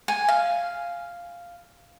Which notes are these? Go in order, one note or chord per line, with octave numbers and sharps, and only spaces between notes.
G#5
F5